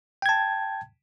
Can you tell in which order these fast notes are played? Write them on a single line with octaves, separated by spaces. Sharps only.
G5 G#6 A5